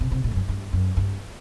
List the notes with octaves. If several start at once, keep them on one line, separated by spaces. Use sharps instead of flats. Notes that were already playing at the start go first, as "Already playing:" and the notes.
C3
C3
A2
F#2
G2
G2
F#2
G2